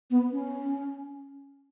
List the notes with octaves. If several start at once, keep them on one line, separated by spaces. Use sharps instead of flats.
B3
C#4